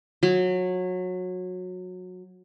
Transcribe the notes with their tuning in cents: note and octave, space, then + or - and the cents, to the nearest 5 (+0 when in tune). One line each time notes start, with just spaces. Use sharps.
F#3 -20